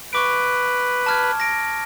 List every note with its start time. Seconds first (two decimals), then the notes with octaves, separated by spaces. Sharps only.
0.13 B4 C#6 D6 D7
1.06 A5 F6 G#6
1.40 A#6 D7